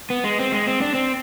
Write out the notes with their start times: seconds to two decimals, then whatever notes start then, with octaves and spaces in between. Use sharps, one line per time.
0.10 B3
0.24 G#3
0.39 C4
0.52 G#3
0.67 C4
0.81 D4
0.95 C4